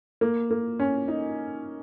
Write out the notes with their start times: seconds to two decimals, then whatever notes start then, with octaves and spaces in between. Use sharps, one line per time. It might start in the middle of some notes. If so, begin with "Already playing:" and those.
0.21 A#3
0.51 A#3
0.80 C#4
1.08 D#4